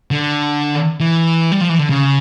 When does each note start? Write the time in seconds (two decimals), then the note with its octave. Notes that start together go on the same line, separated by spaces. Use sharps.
0.11 D3
1.00 E3
1.52 G3
1.61 F3
1.70 E3
1.79 D3
1.89 C#3